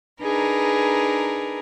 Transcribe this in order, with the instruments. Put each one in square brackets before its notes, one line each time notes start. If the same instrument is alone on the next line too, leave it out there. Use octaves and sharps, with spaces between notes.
[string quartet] D4 D#4 G#4 A#4 B4